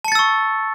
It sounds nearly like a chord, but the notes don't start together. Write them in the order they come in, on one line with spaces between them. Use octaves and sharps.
A5 C#7 A6 E6 C#6